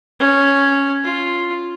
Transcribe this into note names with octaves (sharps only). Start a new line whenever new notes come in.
C#4
F4